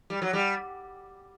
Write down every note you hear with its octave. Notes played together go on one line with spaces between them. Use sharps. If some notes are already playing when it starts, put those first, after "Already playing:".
G3
F#3
G3